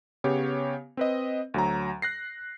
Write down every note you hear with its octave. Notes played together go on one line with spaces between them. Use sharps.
C#3 B3 G4 C#5
C4 B4 D#5
D2 F#3 A#5
F#6 A#6 C7